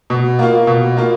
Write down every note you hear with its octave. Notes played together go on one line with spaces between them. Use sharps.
B2
A#3 F4
B2
A#3 F4